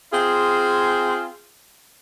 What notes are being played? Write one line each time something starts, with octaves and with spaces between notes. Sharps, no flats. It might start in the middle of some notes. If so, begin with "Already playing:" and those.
C4 F4 G#4